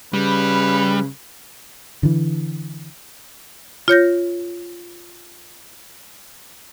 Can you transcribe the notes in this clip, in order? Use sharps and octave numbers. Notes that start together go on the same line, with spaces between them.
C#3 G3 B4
D3 E3
F4 C#5 G6 A#6